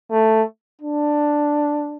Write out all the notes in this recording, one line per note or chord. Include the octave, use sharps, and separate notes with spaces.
A3
D4